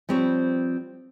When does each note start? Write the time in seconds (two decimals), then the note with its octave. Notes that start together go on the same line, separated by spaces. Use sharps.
0.09 F3 G3 C4 B4 C#5